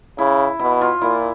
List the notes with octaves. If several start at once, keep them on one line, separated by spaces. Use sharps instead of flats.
C#3 E4
B2 E4
F4
A#2 E4